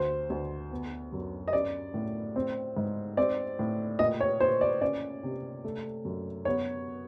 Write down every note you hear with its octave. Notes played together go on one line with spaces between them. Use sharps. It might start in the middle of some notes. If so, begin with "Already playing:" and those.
Already playing: D2 C5
D2
B3
F#2
D#5
C#4 D5
A2
C4
G#2
C4 D5
A2
A#2 D#5
C#5
A#2 C5
D5
C#4 D5
C3
A3
F#2
B3 C#5